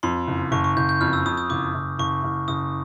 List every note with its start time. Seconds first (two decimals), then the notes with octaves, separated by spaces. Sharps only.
0.03 F2 C6
0.27 F#1
0.52 F#1 C#6
0.64 C#6
0.77 F#1 G6
0.89 G6
1.01 F2 F6
1.13 E6
1.26 F2 D#6
1.37 D#6
1.50 F#1 D6
1.74 F#1
1.99 F#1 C#6
2.24 F#1
2.48 F#1 D#6